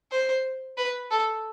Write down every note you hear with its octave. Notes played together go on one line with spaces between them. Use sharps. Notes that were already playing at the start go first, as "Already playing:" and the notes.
C5
B4
A4